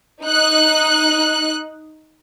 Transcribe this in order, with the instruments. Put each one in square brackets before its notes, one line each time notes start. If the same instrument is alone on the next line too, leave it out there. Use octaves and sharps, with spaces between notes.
[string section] D#4 F#6